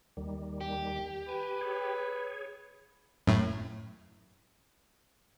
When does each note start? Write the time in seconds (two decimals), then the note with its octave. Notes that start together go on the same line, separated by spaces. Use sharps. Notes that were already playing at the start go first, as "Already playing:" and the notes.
0.17 D#2 D#3 G3
0.61 G4
1.29 B4 G#5
1.61 G#4 C#5
3.27 F#2 A2